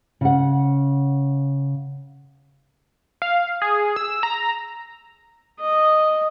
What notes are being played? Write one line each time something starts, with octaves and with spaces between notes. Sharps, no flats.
C#3 F#5
F5
G#4
E6
A#5
D#5